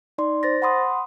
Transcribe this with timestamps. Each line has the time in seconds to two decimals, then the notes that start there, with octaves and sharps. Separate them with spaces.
0.18 D#4 D5 C6
0.43 C5 A6 A#6
0.62 F#5 B5 C6 D#6